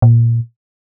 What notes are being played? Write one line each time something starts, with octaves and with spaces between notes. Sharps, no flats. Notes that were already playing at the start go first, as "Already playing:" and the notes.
A#2